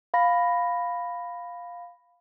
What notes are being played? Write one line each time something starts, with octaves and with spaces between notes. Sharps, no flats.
F5 B5 A#6